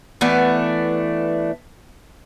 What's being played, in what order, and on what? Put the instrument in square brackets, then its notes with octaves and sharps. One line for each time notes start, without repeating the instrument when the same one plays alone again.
[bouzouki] E3 A3 B3 D4